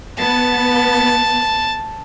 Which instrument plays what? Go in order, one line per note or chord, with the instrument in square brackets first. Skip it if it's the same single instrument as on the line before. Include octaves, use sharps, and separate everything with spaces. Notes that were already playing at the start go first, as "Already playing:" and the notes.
[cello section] B3 [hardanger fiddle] A5